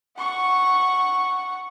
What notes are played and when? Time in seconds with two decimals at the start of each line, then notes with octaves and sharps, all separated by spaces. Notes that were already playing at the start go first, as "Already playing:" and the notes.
0.17 F#5 C#6